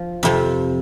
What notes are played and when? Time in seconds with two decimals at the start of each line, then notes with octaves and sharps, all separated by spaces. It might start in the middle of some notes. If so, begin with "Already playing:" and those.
Already playing: F3
0.23 F2 C3 F3